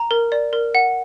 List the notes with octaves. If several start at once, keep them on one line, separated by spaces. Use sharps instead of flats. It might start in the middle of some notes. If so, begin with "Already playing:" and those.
Already playing: A#5
A#4
D5
A#4
F#5